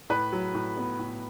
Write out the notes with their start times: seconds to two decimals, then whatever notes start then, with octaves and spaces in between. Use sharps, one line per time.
0.09 A2 B4
0.32 F#3
0.54 A2
0.77 B3
0.99 A2